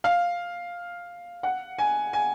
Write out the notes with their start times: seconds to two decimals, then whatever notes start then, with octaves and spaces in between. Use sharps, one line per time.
0.04 F5
1.43 F#5
1.78 G#5
2.13 G#5